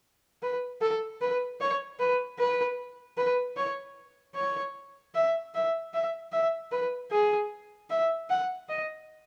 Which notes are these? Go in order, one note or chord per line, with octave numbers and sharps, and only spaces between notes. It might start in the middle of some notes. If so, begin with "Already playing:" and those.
B4
A4
B4
C#5
B4
B4
B4
C#5
C#5
E5
E5
E5
E5
B4
G#4
E5
F#5
D#5